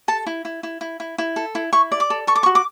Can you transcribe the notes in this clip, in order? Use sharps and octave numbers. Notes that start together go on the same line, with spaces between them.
A4 A5
E4
E4
E4
E4
E4
E4
A4
E4
E4 C#6
D5
D6
A4
A4 C#6
D6
C#6
F#4
D6